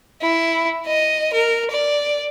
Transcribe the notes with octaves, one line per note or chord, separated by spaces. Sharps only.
E4
D#5
A#4
D5